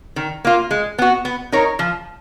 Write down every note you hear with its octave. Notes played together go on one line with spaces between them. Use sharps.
D#3
A#3 F4
G#3
B3 F#4
B3
D#4 A#4 C#5
F3